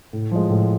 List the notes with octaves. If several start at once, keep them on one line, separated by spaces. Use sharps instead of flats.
A2
F3 G#3
A2